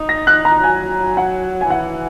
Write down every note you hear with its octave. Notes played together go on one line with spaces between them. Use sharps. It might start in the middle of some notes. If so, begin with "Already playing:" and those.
Already playing: D#4
A#6
F#6
A#5
F#3 G#5
F#5
G#5
E3 F#5